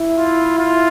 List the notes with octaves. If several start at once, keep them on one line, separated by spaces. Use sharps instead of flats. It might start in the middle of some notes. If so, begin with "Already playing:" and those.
Already playing: E4
F4
F4